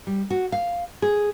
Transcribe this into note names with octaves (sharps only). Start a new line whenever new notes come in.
G3
F#4
F5
G#4